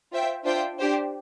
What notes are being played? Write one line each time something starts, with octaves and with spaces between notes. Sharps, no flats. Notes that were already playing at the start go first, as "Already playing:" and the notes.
F4 C5 E5 G5
D4 F4 C5 E5 G5
D4 G4 C5